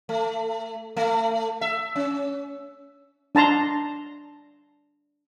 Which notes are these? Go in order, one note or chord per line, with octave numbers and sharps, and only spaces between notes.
A3
A3
E5
C#4
D4 A5 A#5 C6